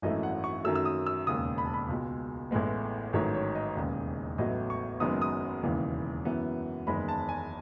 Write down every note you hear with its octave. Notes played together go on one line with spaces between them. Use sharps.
G#1 F#2 E3 A3 D#5
F#5
C#6
F#2 D#3 F#3 A3 E6
E6
D#6
E6
E1 D#2 C#3 D#6
B5
A5
B5
C#2 B2 G#3
A1 A2 G#3 B3
A1 G#2 D#3 F#3 A3 C#5
C#5
D#5
E1 D#2 C#3
A1 A2 F#3 B3 D#5
C#6
F#1 F#2 D#3 G#3 B3 D#6
D#6
E1 D#2 C#3 E3
F#2 E3 B3
F#1 E2 D#3 G#3 B5
A5
G#5